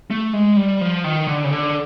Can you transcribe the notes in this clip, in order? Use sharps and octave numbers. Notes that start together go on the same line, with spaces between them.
A3
G#3
G3
F3
D#3
D3
C#3
D3